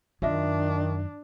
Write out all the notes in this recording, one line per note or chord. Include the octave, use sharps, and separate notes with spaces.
F#2 D#3 D4 F4 D#5 E5